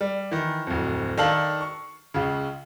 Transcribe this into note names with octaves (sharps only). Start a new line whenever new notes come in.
G3
D#3 E3
D1 F2
D#3 D4 A4 F5 A5 F#7
C#6
C#2 C#3